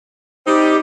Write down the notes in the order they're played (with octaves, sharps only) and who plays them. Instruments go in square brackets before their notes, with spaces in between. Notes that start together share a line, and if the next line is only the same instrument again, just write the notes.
[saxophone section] G3 C4 D#4 [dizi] G4